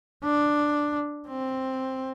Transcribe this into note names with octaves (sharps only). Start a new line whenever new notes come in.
D4
C4